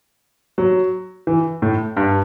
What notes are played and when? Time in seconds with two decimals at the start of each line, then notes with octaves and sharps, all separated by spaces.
0.58 F#3
1.27 E3
1.62 A2
1.97 G2